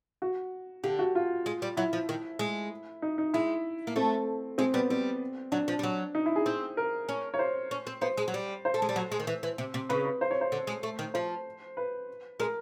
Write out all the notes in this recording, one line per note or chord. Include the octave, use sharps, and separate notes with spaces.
F#4
D3 G4
F#4
F4
G#3
G3
F#3 E4
F3
D#3
G#3
D#4
D#4
G#3 E4
A#3
A3 C4
G#3 C4
G3 B3
G3 C4
F#3 D4
F3
G3
F#3
D#4
E4
G#4
C4
A#4
C#4
C#5
C5
C#4
C4
B3 C5
G#3
F#3
G3
C5
A3
G#3
G3
F#3
G#3
D#3
E3
E3
C3
C3
C#3 B4
B4
C5
C#5
C5
D3
G#3
A3
D#3
F3 C5
B4
G#3 A#4